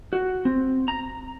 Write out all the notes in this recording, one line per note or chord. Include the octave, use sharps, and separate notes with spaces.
F#4
C4
A#5